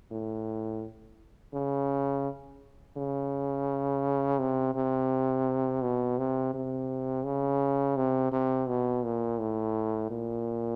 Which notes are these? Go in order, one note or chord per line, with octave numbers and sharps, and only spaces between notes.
A2
C#3
C#3
C3
C3
B2
C3
C3
C#3
C3
C3
B2
A#2
A2
A#2